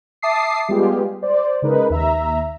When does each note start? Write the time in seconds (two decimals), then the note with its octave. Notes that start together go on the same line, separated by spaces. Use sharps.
0.22 E5 A5 D6 D#6 C7
0.68 G3 G#3 B3 F4 G4 G#4
1.22 C5 D5
1.62 C#3 G#3 D#4 A#4 B4
1.90 D#2 E5 A#5